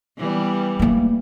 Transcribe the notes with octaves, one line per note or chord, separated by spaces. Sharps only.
E3 G3 B3
A3 A#3